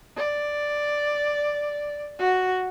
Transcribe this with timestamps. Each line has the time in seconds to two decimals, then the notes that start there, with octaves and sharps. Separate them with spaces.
0.17 D5
2.19 F#4